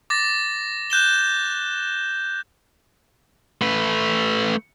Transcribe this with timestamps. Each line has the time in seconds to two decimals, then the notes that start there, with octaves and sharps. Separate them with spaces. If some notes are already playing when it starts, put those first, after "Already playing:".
0.10 D6 A6 A#6
0.90 F#6 G6 E7 G7
3.62 A3 B4